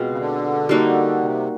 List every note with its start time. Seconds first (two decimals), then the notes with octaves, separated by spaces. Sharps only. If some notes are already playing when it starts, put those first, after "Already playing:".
Already playing: B2 G#3 C4 F4
0.10 C#3
0.18 D3
0.69 G3 A#3 D#4 F#4
1.21 C3